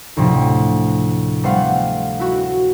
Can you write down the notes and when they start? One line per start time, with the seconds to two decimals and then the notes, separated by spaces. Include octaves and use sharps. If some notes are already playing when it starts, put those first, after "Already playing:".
0.17 D2 A2 C3 F3
1.43 G3 A3 B3 C5 F5 F#5
2.19 E4 F#4